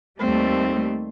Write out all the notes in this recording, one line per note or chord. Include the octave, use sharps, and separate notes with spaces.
D#2 G3 A3 C4